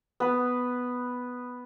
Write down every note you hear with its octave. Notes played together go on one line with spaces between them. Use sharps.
B3 B4